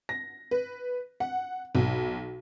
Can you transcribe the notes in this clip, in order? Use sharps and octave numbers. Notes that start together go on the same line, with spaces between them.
A#6
B4
F#5
B1